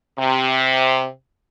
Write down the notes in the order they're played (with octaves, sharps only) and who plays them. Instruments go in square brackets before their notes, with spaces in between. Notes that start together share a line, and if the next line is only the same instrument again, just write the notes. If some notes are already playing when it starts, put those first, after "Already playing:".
[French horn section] C3